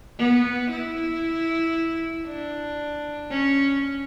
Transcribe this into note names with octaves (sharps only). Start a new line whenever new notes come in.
B3
E4
D4
C#4